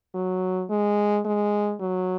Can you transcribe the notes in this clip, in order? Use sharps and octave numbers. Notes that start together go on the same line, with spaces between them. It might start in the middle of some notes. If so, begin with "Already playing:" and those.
F#3
G#3
G#3
F#3